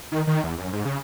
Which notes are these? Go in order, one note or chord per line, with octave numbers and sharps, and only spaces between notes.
D#3
D#3
E2
F#2
G#2
C#3